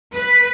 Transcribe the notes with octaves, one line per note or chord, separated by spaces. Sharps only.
B4